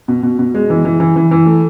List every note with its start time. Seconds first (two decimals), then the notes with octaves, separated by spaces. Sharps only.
0.08 B2
0.23 B2
0.39 B2
0.54 G#3
0.70 E3
0.85 E3
1.00 E3
1.16 E3
1.31 E3
1.46 A3